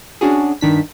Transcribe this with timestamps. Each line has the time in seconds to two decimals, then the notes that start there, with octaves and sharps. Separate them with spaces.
0.21 C#4 D4 F#4 G#4
0.61 G2 D#3 D4 B6